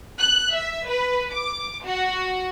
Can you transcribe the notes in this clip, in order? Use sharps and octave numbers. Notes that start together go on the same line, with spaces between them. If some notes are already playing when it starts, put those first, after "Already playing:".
F#6
E5
B4
D6
F#4